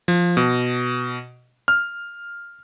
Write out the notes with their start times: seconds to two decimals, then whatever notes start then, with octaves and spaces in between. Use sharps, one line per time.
0.08 F3
0.37 B2
1.68 F6